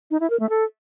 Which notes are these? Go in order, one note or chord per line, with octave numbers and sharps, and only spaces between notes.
D#4
E4
A#4
A3
A4